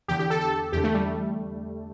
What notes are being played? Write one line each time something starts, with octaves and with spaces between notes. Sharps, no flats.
E2 D3 G4
G4
A4
A4
E2 D3 G4
A3
G3